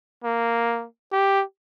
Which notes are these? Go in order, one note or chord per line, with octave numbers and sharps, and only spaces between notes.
A#3
G4